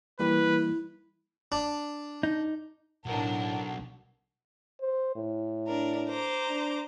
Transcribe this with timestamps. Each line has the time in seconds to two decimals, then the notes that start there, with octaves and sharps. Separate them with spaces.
0.19 E3 G3 A#3 E4 B4
1.52 D4
2.23 D#4
3.06 B1 A2 D4 A#4 F#5
4.81 C5
5.16 A2
5.67 D4 A#4
6.09 C5 A#5 D6
6.48 D4